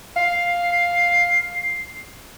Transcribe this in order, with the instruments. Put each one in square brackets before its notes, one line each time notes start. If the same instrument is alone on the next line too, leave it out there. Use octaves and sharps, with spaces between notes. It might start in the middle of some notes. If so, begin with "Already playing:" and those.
[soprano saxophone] F5 [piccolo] C7